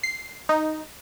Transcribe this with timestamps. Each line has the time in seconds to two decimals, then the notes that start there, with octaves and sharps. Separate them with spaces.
0.03 C7
0.49 D#4